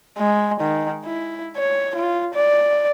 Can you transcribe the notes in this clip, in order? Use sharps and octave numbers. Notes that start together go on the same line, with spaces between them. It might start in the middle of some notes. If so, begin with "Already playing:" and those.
G#3
D#3
E4
C#5
F4
D5